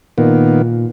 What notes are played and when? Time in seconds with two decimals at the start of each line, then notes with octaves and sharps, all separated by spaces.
0.18 A#2 D#3 A#3 B3